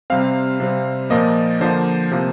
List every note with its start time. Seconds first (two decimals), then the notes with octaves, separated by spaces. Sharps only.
0.10 C3 G3 C4 F5
0.60 C3 G3 C4
1.10 A#2 F3 A#3 D#5
1.60 D3 F3 A#3 C5
2.11 C3 F3 A#3